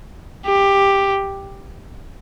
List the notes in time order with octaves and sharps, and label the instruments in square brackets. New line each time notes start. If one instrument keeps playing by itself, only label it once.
[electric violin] G4